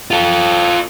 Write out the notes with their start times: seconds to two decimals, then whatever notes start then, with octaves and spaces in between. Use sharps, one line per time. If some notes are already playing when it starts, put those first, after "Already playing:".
0.11 F4 A4